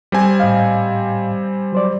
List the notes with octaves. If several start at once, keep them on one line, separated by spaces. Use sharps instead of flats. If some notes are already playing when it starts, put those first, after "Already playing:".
G3 C4 G#5
A2 D#5 F5
F#3 C5 D5